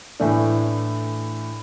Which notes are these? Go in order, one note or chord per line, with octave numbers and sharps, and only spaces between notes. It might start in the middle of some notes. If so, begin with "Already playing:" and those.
A2 E3 A3 D4